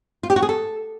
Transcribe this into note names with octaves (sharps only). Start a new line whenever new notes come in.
F4
G4
F#4
G#4
A4